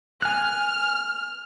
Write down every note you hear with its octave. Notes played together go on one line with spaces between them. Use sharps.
G#5 F6 F#6